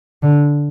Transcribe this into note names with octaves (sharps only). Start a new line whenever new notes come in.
D3